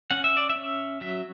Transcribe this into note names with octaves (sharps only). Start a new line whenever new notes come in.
C#4 F#5
E5
D5
E5
C#4
F#3 E5